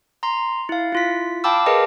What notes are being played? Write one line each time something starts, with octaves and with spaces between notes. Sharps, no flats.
A#5 C6
E4 F5
E4 F4 B6
F5 G5 A5 B5 D6 E6
G#4 A#4 B4 D#5 A5